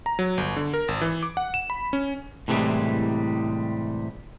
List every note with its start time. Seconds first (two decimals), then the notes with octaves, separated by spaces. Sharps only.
0.06 A#5
0.19 F#3
0.38 G1
0.56 D3
0.74 A#4
0.88 G#1
1.01 E3
1.23 D6
1.37 F#5
1.54 E7
1.70 B5
1.93 C#4
2.48 A2 C3 E3 F3 G3 G#3